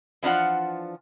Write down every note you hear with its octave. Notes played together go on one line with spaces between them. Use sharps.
E3 F3 D4 F4 F#5